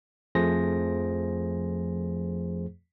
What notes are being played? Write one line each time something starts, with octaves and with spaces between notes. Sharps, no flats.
F2 F3 A3 G#4 C5 A#6